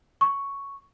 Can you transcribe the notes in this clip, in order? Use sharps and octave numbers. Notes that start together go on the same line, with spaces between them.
C#6